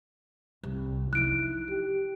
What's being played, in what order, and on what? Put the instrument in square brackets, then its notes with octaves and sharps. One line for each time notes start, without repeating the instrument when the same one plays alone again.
[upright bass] C2
[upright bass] F3 D#4 [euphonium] E4 [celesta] F#6 D7
[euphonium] G4